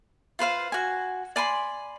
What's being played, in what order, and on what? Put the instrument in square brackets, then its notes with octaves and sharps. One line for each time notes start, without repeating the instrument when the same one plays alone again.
[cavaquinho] F4 B4 C5 F5
F#4 G#5
D5 G#5 B5 C6